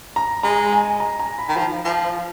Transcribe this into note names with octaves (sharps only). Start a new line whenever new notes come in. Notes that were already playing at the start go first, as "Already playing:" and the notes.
A#5
G#3 A#5
G#5
A#5
A#5
B5
D#3
F3
F3